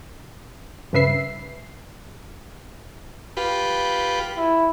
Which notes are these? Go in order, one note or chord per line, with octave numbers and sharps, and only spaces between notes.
G2 C#3 B4 E5 C7
F4 G4 B4
E4